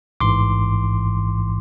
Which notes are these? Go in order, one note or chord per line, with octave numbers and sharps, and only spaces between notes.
A1 G#2 E3 C6 D6